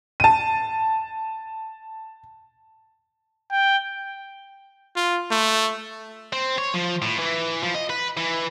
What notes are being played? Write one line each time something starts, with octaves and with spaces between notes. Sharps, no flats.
A5 D#7
G5
F4
A3
C4
C#5
F3
A2
E3
F3
D#5
B4
E3